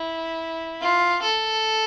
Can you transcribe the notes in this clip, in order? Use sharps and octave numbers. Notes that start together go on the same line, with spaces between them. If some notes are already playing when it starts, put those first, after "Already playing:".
Already playing: E4
F4
A4